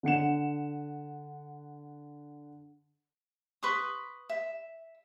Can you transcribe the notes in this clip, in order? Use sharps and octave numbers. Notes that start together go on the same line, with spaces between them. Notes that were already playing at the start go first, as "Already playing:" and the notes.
D3 F#5 C#7 E7
B4 C6 C#6 D#6
E5